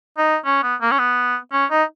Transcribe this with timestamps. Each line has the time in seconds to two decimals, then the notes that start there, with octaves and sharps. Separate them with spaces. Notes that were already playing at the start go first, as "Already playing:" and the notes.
0.18 D#4
0.46 C#4
0.63 B3
0.81 A#3
0.91 C#4
0.99 B3
1.53 C#4
1.71 D#4